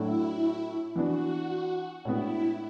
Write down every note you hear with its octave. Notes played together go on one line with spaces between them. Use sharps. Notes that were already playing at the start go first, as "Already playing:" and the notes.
Already playing: A2 F#3 A3 D4 E4 F#4
E3 B3 D4 F#4
A2 G#3 B3 D4 E4